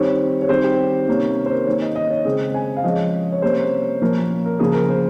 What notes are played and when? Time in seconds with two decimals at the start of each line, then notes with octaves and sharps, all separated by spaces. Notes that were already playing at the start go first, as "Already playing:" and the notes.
Already playing: D#3 G3 C4 C#5
0.41 C#5
0.49 D#3 G3 C4 C5
0.64 G4
1.08 C3 D#3 A#3 C#4
1.46 C5
1.51 A#4
1.67 D#3 A#3 C#4 C#5
1.82 D#5
1.96 D#5
2.10 C#5
2.25 C#3 G#3 C4 G#4
2.54 G#5
2.77 F5
2.84 F3 G#3 C#4 D#5
3.32 C#5
3.42 C3 G3 A#3 C#4 C5
4.02 A#2 F3 A#3 C#4 A#4
4.45 A#4
4.59 C#3 F3 A#3 G#4
4.73 A#4
4.89 C5